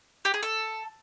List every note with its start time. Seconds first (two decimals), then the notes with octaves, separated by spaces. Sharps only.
0.25 G4
0.34 G#4
0.43 A4